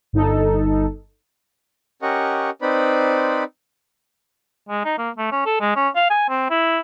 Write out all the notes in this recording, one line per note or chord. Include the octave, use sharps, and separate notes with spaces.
G1 D#4 A4
C#4 G4 A#4 D#5 F#5 C#6
C4 D#4 B4 C5 D5 B5
G#3
D#4
A#3
A3
C#4
A4
G#3
C#4
F5
G#5
C4
E4